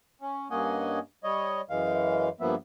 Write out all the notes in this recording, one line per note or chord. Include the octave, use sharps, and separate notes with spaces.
C#4
G2 A#3 C#4 D#5 F#5 G#5
G3 C#5 D#5
F#2 E3 G#3 F5
G2 F3 A#3 B3 E5